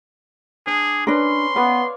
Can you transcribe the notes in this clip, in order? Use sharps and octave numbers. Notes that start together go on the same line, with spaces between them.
D4 G#4
C#4 D4 A#4 B4 C6
B3 B4 C#5 D5 F5